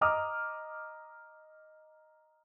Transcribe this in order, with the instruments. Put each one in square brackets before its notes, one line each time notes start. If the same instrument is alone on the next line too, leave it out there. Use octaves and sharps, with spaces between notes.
[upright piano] D#5 A#5 D6 D#6 F6